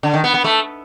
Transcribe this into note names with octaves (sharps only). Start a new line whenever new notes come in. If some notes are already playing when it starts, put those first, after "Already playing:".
D3
D#3
B3
B3
A3